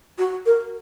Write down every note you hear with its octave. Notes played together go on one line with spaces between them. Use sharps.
F#4
A#4